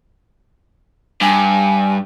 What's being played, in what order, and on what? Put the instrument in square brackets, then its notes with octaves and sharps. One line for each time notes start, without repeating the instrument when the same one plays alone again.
[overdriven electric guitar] G2 [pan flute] G#5